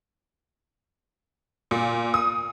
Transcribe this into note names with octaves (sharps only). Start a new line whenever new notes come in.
A#2
D#6